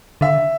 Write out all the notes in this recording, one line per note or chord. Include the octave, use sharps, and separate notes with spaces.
D3 E5